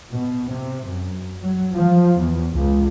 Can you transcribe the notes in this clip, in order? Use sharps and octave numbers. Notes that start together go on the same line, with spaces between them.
B2
C3
F#2
F#3
F3
E2
C#2